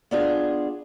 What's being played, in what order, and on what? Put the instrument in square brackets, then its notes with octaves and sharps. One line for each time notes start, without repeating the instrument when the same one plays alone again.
[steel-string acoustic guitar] B3 D4 F4 G#4